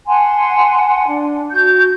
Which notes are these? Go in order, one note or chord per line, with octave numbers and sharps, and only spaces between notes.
F#5 G#5 A5 C6
D4
F#4 G6